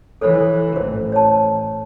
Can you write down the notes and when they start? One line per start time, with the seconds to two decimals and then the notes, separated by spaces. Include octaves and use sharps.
0.21 E3 A4 C#5
0.76 A1 C5
1.12 C#5 A5